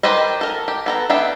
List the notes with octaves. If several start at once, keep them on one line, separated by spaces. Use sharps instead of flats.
D#3 G4 B4 C5 D#5
A4 A#4
G4
B3 A4 A#5
B3 D4 E5 G5